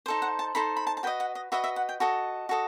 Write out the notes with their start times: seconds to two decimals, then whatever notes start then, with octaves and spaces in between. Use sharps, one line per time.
0.06 D#4 A4 C5
0.22 F#5
0.39 A5
0.55 D#4 A4 C5 B5
0.76 B5
0.87 A5
0.97 A5
1.03 F#4 B4 D#5 G5
1.20 F#5
1.35 D#5
1.52 F#4 B4 D#5 E5
1.64 E5
1.76 F#5
1.89 G5
2.00 F#4 A4 D#5 A5
2.49 F#4 A4 D#5